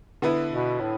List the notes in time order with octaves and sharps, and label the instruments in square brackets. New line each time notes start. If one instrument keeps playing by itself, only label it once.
[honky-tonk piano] D3 B3 E4 B4
[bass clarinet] B2
A2